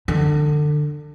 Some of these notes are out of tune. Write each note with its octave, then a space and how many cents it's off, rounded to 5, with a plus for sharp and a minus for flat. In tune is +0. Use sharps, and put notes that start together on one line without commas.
D3 +25